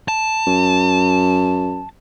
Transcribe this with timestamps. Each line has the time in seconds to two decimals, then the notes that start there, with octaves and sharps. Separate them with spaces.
0.08 A5
0.47 F#2